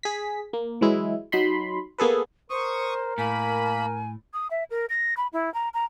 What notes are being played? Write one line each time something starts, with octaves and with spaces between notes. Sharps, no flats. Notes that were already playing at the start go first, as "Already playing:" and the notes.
G#4 B6
A#3
E3 F#3 G#3 E4
F#3 D#4 B5 C6
A#3 B3 G#4 A4 B4
A#4 C5 C#6 D#6
A2 A#3 G#5 B5
D#6
E5
A#4
A#6
B5
E4
A#5
A#5